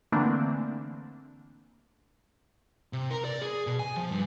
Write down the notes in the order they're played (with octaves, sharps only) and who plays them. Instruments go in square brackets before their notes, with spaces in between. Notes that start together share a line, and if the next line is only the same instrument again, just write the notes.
[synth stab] D3 E3 A3 A#3 C4 D4
[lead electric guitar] C3
A#4
D5
G#4
B2
G#5
F3
G2